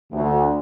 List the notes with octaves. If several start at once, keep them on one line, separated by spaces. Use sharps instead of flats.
D2